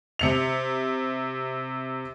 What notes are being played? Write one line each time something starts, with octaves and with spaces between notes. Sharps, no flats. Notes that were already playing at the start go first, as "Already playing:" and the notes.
C3 C#7 F7